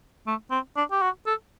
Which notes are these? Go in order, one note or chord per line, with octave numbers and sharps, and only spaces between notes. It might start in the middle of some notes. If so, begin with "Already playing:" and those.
A3
C4
D4
G4
F#4
A4